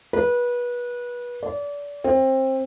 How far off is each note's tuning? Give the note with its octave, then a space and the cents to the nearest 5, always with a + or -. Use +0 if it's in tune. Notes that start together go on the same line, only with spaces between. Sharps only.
B4 -25
D5 -30
C4 +20